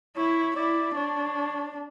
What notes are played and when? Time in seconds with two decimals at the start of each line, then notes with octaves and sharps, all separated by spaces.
0.17 E4 C#5
0.56 E4 D5
0.95 D4 C#5